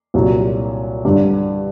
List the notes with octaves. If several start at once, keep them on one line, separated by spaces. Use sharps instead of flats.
C2 A#2 F#3
G2 D3 G3